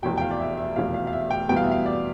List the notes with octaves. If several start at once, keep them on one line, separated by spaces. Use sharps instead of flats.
F1 E2 B2 G5
G5
F5
D5
E5
E5
F1 E2 B2 F5
F5
F5
E5
G5
E2 B2 G3 B3 G5
F5
E5
F5
D5